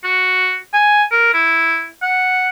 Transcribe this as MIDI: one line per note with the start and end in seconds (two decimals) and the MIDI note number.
0.04 0.57 66
0.74 1.04 80
1.11 1.30 70
1.34 1.87 64
2.02 2.50 78